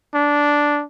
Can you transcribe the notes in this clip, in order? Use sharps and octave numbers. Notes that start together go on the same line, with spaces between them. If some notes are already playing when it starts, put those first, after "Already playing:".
D4